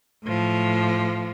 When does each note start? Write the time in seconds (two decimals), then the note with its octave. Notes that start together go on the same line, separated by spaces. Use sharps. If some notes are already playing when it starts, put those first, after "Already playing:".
0.25 A2 F3